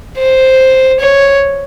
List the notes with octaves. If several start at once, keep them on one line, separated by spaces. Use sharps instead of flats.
C5
C#5